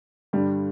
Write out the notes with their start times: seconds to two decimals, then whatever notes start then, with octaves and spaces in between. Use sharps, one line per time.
0.33 G2 D3 G3